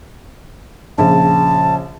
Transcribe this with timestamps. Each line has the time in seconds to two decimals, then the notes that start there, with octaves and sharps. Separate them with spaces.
0.98 A#1 C#3 A5